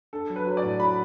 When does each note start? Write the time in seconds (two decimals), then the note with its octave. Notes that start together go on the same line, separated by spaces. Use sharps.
0.13 D4 A4
0.30 F#3
0.36 B4
0.47 F#3
0.57 D5
0.63 A2
0.80 F#3 B5